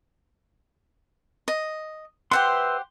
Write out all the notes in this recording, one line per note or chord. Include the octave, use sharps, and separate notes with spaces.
D#5
G4 B4 C5 E5 F#5 C6